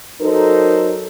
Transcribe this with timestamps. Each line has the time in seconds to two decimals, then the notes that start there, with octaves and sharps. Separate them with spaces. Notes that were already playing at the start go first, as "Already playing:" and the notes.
0.21 F#3 D#4 A4 A#4 C5